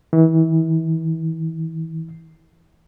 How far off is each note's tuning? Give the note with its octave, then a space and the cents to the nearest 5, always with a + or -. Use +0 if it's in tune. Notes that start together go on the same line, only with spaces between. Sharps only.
E3 -30